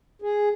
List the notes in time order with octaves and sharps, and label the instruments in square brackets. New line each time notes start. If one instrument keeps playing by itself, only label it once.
[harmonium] G#4